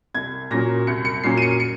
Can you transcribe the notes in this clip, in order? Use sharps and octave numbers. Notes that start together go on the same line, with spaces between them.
C2 G#6
A#2 F#3 A#3 C#4 A#6
C2 C#7
C#7
A#2 F#3 A#3 C#4 C7
D#7
C#7
C#7